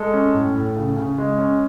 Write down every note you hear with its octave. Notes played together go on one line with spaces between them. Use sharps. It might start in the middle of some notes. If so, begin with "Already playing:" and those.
Already playing: G#3 A4
C#4
A2
A2
C#3
C#3
G#3
C#4